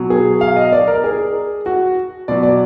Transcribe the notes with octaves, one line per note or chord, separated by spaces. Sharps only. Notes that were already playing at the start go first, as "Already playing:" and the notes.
Already playing: B2 F#3
G#4
F5
D#5
D5
A#4
G#4
F#4
B2 F#3 D5
D5